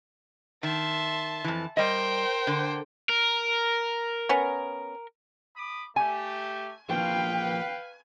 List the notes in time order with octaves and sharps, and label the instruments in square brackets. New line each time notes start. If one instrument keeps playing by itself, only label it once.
[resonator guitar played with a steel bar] D#3 [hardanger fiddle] E5 C6 [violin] A5
[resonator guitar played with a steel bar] F2 E3
[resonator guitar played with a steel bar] G3 D#5 [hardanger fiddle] A#4 [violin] C5 G5
[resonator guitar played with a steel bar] D3
[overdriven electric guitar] A#4
[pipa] B3 C#4
[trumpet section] B5 D6 D#6
[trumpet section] A3 G4 [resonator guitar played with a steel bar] G#5
[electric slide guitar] F3 A#3 [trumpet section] B4 F5 [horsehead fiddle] G5